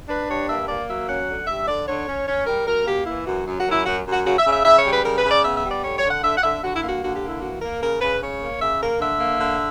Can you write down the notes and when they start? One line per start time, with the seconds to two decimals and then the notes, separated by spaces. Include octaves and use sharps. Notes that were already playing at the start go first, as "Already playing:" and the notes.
0.09 D4 B4
0.29 G2 C#5
0.48 A#3 E5
0.68 A#3 D5
0.88 F#3 E5
1.08 C#4 F#5
1.28 D3
1.47 G2 E5
1.68 D3 D5
1.87 D3 C#5
2.07 C#4
2.27 C#4 C#5
2.46 G3 A#4
2.66 F#2 A#4
2.86 A#3 G4
3.06 E3 E4
3.26 F#2 F#4
3.46 F#2
3.60 F#4
3.65 F#2
3.72 E4
3.86 F#2 F#4
4.06 F#2
4.12 F#4
4.25 C#3 F#4
4.38 E5
4.46 C#3
4.52 E5
4.65 C#3 E5
4.78 C#5
4.84 G3
4.92 B4
5.04 C#3 A#4
5.18 B4
5.24 C#3
5.30 D5
5.43 B3 E5
5.57 E5
5.64 G3
5.71 D5
5.83 D3 C#5
5.97 C#5
6.03 D3
6.10 F#5
6.23 D3 E5
6.37 F#5
6.43 D3 E5
6.62 D3 F#4
6.76 E4
6.83 A#3
6.89 F#4
7.03 D3 F#4
7.15 G4
7.22 A#3
7.29 E4
7.42 E3 F#4
7.61 A#3 A#4
7.82 C#3 A#4
8.01 C#3 B4
8.21 C#3 C#5
8.41 A#3
8.61 C#3 E5
8.81 A#3 A#4
9.01 D3 E5
9.20 A#3
9.41 D3